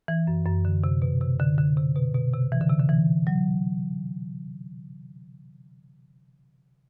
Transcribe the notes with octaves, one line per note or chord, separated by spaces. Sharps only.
E3
F#2
F#2
D3
C3
B2
C3
D3
D3
C3
B2
B2
C3
E3
D3
C3
D3
E3
F#3